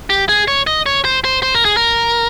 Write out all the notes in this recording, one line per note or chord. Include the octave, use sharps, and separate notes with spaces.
G4
G#4
C#5
D#5
C#5
C5
C5
C5
A#4
G#4
A#4